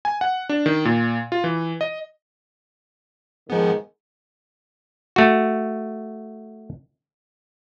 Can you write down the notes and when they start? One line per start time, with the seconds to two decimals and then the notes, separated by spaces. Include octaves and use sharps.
0.05 G#5
0.21 F#5
0.49 D4
0.66 D#3
0.85 A#2
1.32 F4
1.44 E3
1.81 D#5
3.50 G#2 D#3 F3 B3
5.16 A3 F#4